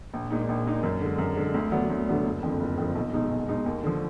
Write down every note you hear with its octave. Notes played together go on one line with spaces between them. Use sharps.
A#1
A#2 G#3 D#4
A#1
A#2 G#3 D#4
F#2
D3 G#3
F#2
D3 G#3
D2
D3 F#3 B3 D4
D2
D3 F#3 B3 D4
F#1
F2 D3 F3
F#1
F2 D3 F3
B1
B2 G#3 D#4
B1
B2 G#3 D#4
D#2
D3 F3